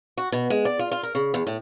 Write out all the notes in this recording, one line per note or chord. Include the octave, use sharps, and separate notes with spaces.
F#4
B2
G#3
D5
F4
F4
A#4
C#3
E2
A2